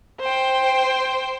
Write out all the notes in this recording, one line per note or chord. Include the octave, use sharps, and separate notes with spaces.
C5 G5